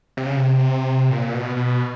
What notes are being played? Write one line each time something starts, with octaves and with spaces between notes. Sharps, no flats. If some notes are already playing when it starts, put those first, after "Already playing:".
C3
C#3
C3
A#2
B2
B2